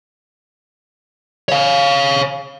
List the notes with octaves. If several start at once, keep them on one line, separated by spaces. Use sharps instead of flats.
C#5 F5